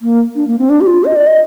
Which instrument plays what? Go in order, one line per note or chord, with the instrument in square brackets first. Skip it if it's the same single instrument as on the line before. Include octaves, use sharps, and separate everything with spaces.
[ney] A#3
D4
A#3
C4
D4
G4
F4
D#5
D5
D#5